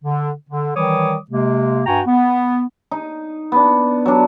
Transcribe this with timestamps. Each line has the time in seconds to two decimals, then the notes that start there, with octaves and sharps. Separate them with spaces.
0.04 D3
0.48 D3
0.76 D#3 E3 G3 C#5 D6 D#6
1.30 C3 G#3 A#3
1.86 G2 F#4 G5 G#5 A#5 C#6
2.06 B3
2.91 D#4
3.52 B3 D4
4.06 F#3 D4